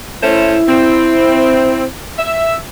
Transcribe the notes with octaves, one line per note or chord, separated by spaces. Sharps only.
A3 C#4 E4 C5
C4
E5